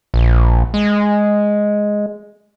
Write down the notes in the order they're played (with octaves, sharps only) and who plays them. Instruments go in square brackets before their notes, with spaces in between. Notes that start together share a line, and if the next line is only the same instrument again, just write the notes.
[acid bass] A#1
G#3